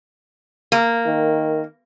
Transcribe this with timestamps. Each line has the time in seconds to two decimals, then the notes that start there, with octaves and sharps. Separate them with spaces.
0.72 A#3
1.06 D#3